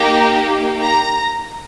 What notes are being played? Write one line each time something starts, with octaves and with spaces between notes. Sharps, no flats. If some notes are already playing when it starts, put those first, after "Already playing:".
Already playing: A#3 D#4 G4 A#5
A#5